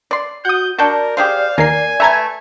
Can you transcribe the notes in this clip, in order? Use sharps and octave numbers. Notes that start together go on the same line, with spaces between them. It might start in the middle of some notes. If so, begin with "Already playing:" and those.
D5 C6
F#4 F#5 D#6 G6
D4 F#4 A#4 D5 A5 G6
G4 G#4 C5 F5
D#2 A#3 A#4 G#5 C7
A3 B4 E5 A5 A#5 G#6